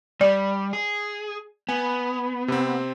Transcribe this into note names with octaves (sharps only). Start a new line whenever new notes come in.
G3 D5
G#4
B3 G#5
C3 C4